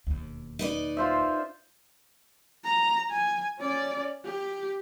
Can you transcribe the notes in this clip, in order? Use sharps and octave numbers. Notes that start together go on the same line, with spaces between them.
E1 D#2
D#4 B4 D5
F4 C5 E5
A#5
G#5
C#4 D5
G4